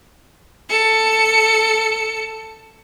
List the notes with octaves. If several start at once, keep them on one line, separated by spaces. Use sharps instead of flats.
A4 C#7